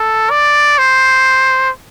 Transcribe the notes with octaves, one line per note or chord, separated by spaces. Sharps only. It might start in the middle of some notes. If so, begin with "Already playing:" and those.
Already playing: A4
D5
C5